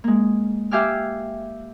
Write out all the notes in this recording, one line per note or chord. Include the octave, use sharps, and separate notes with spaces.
G#3 A#3
G4 E5 F5 G#5 D6 F6